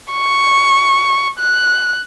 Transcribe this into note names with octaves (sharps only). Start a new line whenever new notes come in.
C#6
F#6